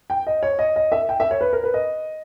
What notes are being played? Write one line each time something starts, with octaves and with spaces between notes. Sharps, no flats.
G5
D#5
C#5
D#5
D#5
E5
G5
E5
C#5
B4
A#4
B4
D#5